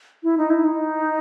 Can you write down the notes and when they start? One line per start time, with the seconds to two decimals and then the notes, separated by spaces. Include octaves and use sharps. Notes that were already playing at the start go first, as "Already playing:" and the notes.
0.23 E4
0.38 D#4
0.50 E4
0.64 D#4